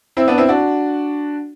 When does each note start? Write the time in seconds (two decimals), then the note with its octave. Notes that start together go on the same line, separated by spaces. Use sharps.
0.17 C4 E4
0.28 B3 D4
0.38 C4 E4
0.49 D4 F#4